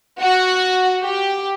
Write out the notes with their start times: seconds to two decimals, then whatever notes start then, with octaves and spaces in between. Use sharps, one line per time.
0.21 F#4
1.03 G4